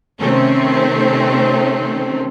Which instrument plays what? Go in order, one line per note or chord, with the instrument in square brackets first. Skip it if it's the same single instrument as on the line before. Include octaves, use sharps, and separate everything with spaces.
[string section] C3 D#3 A3 C4 C#4